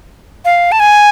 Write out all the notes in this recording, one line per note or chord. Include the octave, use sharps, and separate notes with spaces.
F5
A5
G#5